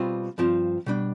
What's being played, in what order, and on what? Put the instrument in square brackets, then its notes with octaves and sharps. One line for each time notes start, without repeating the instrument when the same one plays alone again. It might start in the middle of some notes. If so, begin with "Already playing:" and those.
Already playing: [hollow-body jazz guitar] B2 G3 C4 F4
G2 F3 C4 F4
B2 G3 D4